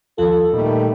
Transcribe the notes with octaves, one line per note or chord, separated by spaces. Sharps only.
D#2 F3 F4 A4
A#2 D#3 G3 A3